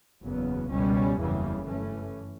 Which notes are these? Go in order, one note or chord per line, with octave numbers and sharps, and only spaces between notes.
F#1 E2 C#3 F#3 B3
C#2 B2 G3 C#4
F#1 E2 C#3 E3 G3
G2 E3 A3 C#4